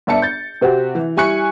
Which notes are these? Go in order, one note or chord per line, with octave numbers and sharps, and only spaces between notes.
G1 D5 E5 A5 C#7
G6 A6
C3 C4 F#4 G4
E3
G3 E4 G#5 C#6 F#6 C#7